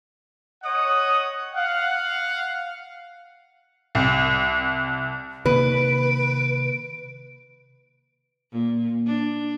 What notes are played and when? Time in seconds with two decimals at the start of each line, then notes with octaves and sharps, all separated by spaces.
0.62 C#5 D#5 F#5 D#6
1.54 F5 F#5
3.95 C2
5.46 C3 D#3 A#3 B4 D7
8.52 A#2
9.06 D4